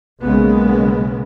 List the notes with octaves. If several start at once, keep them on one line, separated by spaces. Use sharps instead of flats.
B1 C#3 G#3 A#3 B3